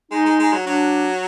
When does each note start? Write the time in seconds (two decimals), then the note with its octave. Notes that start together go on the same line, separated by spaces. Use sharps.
0.12 G#3 D#4
0.26 G#3
0.39 G#3
0.53 F#3
0.66 F#3 D4